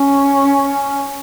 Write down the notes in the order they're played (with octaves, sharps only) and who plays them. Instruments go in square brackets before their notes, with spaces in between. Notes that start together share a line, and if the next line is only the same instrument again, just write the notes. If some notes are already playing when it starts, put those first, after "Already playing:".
Already playing: [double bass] C#4